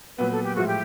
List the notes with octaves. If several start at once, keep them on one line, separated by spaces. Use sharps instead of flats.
A#2 F#3 B3 B4
A4
G4
A2 F3 G#3 F#4
G4